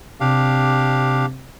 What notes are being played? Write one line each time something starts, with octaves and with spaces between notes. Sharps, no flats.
C3 D4 G4 F5